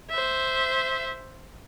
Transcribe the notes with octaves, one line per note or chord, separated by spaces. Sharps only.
C5 E5